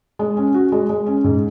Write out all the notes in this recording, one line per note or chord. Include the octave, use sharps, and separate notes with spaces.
G#3
C#4
F#4
G#3
G#3
C#4
G#2